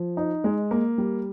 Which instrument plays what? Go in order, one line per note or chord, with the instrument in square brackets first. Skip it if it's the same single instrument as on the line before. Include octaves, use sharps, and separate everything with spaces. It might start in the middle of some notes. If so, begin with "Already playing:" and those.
Already playing: [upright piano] F3
D#4
G#3
A#3
G3